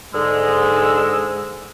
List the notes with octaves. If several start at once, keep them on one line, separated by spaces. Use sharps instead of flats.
G#2 D3 G#3 E6